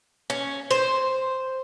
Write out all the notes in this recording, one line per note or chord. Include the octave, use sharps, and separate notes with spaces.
C#4
C5